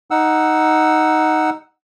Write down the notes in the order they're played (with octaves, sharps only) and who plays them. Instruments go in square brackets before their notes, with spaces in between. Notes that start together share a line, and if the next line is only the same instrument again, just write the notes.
[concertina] D#4 F#5 E6